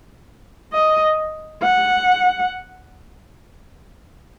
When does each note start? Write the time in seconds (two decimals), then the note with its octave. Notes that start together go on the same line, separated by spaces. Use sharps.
0.73 D#5
1.63 F#5